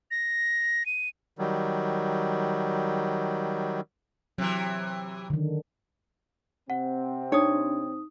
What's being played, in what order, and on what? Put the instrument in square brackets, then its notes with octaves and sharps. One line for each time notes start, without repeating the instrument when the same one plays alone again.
[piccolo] A#6
D#7
[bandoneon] D#3 F#3 G3
[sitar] C3 E3 [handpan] F#3
[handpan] D3 D#3
[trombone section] C3 C4 [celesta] F#5
[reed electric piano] D4 [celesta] D#4 D#6 [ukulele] C#5